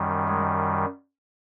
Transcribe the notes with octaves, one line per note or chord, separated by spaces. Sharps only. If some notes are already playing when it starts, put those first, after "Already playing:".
Already playing: F#2 D#3 G3
G#3